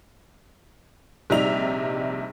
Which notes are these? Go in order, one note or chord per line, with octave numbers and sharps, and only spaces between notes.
A#1 C3 G3 D#4 E5 F7